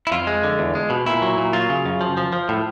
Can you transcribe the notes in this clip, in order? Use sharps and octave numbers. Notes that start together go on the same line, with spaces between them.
E4
F2 F4
G#3
D3
E2
G#3
B2
A#2 E4
F#3
A#2
F#3 F4
C#3
F#2
F3
F3
F3
A2